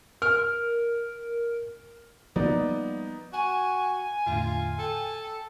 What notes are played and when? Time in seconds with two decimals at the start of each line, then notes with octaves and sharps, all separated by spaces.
0.22 A#4 F6
2.36 F3 G3 A#3 B3 D#4 D5
3.33 F#4 G#5
4.26 E2 A2 D3 F4
4.79 A4 G5